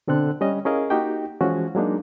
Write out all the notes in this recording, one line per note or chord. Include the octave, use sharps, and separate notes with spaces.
B2 D3 C4 A4 F#6
G3 C#4 C#5 D#5
C#4 E4 G#4 A#4 D#5 F5
A#3 D#4 F#4 G4 G5
E3 F3 G#3 C#4 E4 F#4
F#3 G#3 A#3 D4 D#4